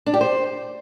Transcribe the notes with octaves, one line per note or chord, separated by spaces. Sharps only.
D4
G4
C5